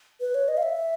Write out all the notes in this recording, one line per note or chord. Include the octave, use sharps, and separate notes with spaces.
B4
C#5
D#5
F5
E5